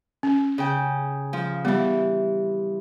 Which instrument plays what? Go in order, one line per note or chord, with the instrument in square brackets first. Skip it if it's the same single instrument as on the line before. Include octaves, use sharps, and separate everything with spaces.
[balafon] C#4
[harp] C#3 G5
F3
[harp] E3 G3 [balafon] B3